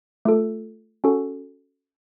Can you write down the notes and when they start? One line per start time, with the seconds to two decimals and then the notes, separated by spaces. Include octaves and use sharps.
0.25 A3 F4 A4
1.04 C#4 F#4 A4